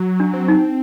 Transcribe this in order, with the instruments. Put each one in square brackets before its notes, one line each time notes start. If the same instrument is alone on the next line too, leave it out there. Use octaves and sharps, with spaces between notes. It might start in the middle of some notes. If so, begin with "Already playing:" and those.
Already playing: [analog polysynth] F#3
[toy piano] D4
[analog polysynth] C4
[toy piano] D#4